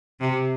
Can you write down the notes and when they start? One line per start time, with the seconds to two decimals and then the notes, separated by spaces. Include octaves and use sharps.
0.21 C3